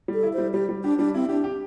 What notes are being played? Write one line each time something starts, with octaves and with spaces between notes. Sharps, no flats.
G3
A4
E4
G3 C5
G3 G4
G3
D4 G4
G3 D4
C4 E4
D4 G4
G4